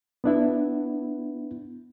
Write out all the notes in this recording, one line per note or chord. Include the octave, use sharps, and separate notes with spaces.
B3 D4 E4